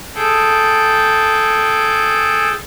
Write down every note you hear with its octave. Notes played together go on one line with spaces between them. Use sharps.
G#4 A4 G5